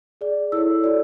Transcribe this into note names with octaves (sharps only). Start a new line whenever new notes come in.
G#4 D5
E4 A4 C#5 E6
F#4 A4 D5